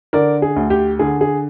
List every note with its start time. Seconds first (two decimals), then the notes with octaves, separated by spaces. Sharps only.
0.13 D3 A#4 D5
0.42 G#4
0.56 D2
0.70 G4
0.99 D3 G#4
1.21 G#4